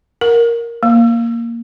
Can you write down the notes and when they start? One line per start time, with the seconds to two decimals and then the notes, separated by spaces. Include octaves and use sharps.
0.21 A#4
0.83 A#3